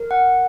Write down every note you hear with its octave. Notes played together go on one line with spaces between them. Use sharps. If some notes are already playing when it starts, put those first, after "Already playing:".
Already playing: A#4
F#5